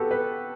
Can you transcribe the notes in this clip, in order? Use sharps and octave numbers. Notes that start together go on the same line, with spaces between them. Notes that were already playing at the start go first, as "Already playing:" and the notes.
Already playing: B3 F#4 G4 A4
B4